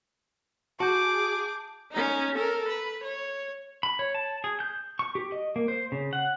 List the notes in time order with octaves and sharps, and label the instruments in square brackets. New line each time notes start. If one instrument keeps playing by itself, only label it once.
[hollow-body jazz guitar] F#4 [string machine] G#4 [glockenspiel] A5 G6 [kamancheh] D6
[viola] C#4 D#4
A4 A#4
B4
C#5
[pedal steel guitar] B5
C#5
A5
G#4
G6
C#6
G4
D#5
A#3
C5
C#3
F#5